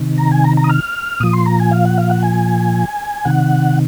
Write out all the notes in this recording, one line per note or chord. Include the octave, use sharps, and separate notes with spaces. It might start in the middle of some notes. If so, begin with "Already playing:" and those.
Already playing: C3 D#3
A#5
G#5
A#5
A#5
D#6
F6
A#2 F3 D#6
C6
A#5
G#5
F5
F#5
F5
F#5
G#5
C3 D#3 F#5